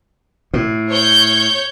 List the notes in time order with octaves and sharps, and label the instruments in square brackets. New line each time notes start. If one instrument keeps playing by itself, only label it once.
[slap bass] A2
[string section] C#5 G6